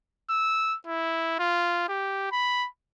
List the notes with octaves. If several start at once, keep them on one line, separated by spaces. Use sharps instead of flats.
E6
E4
F4
G4
B5